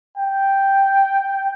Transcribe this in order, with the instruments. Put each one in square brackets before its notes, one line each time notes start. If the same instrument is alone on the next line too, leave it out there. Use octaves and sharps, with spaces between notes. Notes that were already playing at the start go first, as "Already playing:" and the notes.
[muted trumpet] G5